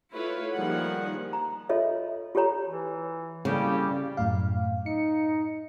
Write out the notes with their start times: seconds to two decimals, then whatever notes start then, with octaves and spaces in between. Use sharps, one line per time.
0.12 A3 E4 F4 B4 C#5
0.55 D#3 F3 G3 A#3 G#4 F#5
1.33 A#5
1.69 F4 A4 C#5 D#5 E5
2.35 F4 G4 A4 C#5 A#5
2.67 E3
3.45 A2 C#3 G3 A#3 G4
4.17 F#2 A2 F5
4.86 D#4 C#7